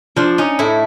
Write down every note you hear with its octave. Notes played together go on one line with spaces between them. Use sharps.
F3 D4
C#4 D#4
A2 E4